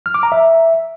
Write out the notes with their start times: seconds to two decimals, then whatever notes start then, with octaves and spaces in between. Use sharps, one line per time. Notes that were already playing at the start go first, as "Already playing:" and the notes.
0.06 F6
0.14 D6
0.23 A#5
0.32 E5